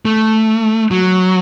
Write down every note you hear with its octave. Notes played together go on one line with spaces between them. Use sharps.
A3
F#3